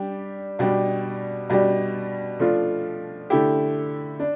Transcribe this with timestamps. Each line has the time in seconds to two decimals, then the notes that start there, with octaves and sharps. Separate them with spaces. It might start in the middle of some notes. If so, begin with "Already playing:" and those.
Already playing: G3 D4 G4
0.59 B2 G3 D4 G4
1.50 B2 G3 D4 G4
2.39 F3 A3 D4 F4
3.30 D3 A3 E4 G4
4.20 D4